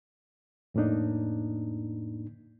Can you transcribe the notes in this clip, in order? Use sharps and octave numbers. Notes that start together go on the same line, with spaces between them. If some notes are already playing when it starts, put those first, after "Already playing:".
F2 A2 A#3 D4 D#4